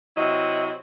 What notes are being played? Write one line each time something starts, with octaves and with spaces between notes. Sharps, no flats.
C3 F#3 E4 D#5